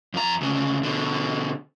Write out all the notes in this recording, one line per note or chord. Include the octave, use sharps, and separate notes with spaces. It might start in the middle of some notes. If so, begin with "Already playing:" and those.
F2 A#5
D2 C#3
B2 D3